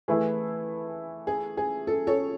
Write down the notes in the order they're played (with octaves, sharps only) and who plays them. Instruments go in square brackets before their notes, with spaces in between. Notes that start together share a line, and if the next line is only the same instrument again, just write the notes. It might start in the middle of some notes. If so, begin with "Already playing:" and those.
[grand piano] E3 A3 E4 [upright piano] G#4 B4
[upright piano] G#4
G#4
A4
A4 C#5